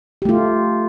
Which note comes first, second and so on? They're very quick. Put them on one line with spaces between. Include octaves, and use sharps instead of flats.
G4 A3 F4